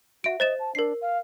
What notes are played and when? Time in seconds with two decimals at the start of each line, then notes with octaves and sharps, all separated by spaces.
0.24 F#4 E5 D7
0.40 C5 D#5 A6 E7
0.59 A5
0.75 D4 A#4 C7
1.01 F5